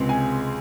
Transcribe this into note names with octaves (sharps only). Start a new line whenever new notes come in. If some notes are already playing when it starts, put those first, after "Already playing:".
Already playing: C#2 C3 G#3 C4
G#5